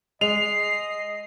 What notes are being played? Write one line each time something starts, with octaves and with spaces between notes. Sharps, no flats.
G#3 D#5 C7 F7